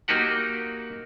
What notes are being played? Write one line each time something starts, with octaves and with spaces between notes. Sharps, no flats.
A#3 D#4 F#4 G4 F#5